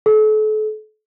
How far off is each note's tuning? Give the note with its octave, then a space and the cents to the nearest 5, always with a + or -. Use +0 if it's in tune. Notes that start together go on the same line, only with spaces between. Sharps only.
A4 -35